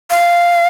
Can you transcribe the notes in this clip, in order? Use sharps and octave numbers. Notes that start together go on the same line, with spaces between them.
F5